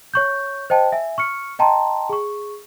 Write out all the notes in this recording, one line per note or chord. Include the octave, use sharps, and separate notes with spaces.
C#5 C#6 G6
C5 D#5 G5 A5
E5 G#5
C#6 F6 C#7
D#5 G5 A5 A#5 C6
G#4 C#6